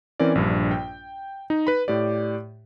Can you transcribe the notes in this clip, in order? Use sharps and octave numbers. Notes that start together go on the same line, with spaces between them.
E3 C4 C#4 A#4 D5
A#1 G2
G5
D#4
B4 B5
A2 G4 D5